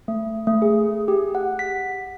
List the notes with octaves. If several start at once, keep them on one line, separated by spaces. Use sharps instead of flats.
A3
A3
G#4
G4
F#5
B6